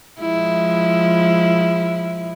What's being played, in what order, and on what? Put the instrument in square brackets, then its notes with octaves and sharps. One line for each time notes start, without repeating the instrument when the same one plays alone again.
[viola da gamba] F3 G#3 E4